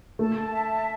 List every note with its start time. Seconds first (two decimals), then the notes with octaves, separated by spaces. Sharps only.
0.19 A3 A5
0.52 E5